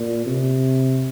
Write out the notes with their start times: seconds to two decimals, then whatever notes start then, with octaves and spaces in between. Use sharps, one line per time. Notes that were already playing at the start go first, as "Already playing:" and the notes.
Already playing: A#2
0.26 C3